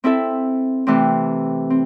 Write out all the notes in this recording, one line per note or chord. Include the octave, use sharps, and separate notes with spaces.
C4 E4 A4 E5
C3 E3 A3 C4
C4